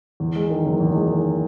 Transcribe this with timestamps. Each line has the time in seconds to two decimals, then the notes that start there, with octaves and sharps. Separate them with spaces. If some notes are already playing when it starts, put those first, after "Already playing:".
0.20 E2
0.36 G#3
0.50 D#3
0.66 F#1
0.80 E2
0.95 G#3
1.11 D#3